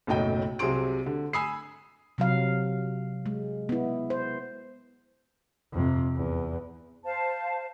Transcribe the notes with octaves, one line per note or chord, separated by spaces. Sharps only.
F#1 B1 A2 F#3 D#5 G5
C2 C3 F#3 G#4 C6 D7
D3
G#5 B5 D#6 E6 C7
C3 F#3 F5
G#3
B3 E4
C5
F2 C3
E2
C5 F5 A5